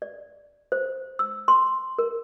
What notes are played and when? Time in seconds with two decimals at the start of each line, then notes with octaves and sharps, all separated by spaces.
0.02 D5
0.72 C5
1.19 E6
1.48 C6
1.98 A#4